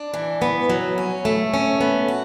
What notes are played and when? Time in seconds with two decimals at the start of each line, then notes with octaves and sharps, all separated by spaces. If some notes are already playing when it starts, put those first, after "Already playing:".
Already playing: D4
0.14 E3
0.42 B3
0.70 F#3
0.98 C#4
1.25 A3
1.54 C#4
1.81 B3
2.08 F#4